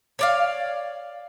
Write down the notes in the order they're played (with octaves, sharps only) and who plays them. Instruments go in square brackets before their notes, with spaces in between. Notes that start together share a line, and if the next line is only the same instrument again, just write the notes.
[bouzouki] C#5 D5 F5